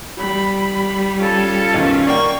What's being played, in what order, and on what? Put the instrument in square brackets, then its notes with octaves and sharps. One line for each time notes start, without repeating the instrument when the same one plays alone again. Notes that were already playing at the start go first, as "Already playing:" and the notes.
[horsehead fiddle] G3 [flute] B5
[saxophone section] C#4 F4 [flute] A4
[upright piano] B1 F#2 D#3
[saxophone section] A#3 C#4 [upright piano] D5 G5 [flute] C#6